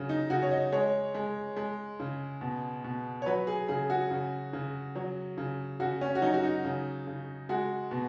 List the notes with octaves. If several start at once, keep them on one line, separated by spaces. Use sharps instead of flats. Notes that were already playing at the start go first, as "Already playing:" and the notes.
Already playing: C#3 F#3
D#4
C#3 F#4
C#5
D#5
G#3 C#5
G#3
G#3
C#3
B2
B2
C#5
F#3 B4
G#4
C#3 G#4
F#4
C#3
C#3
F#3
C#3
C#3 F#4
C#4
F#4
F#3 D#4
F#4
D#4
C#3
C#3
G#3 F#4
B2